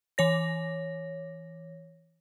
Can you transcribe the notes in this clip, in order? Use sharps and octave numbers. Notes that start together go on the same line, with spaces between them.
E3 C#5 A#6